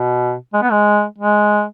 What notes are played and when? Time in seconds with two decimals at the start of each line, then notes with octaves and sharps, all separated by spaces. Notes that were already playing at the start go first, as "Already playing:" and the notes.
Already playing: B2
0.54 G#3
0.62 B3
0.71 G#3
1.18 G#3